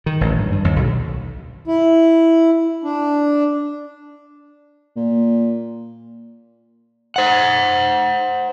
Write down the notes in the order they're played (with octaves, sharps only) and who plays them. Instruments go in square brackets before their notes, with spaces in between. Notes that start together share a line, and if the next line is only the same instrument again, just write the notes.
[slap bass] D#3
A1
G2
G2
D#2
B1
[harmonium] E4
D4
[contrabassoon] A#2
[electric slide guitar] C5 F#5